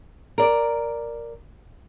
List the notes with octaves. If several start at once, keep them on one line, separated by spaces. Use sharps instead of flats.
A#4 D5